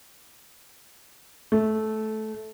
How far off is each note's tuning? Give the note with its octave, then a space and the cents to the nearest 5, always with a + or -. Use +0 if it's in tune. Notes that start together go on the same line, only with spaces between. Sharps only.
A3 -15